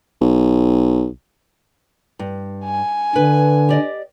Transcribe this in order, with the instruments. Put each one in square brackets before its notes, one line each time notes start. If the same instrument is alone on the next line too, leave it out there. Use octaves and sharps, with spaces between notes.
[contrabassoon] B1
[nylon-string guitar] G2
[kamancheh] G#5
[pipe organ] D3 [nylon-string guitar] B4
[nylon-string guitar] G4 D5 D#5